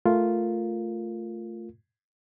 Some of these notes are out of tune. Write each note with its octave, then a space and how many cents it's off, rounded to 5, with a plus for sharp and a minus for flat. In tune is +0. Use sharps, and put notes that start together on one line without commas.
A3 +0 F4 +0 A#4 +0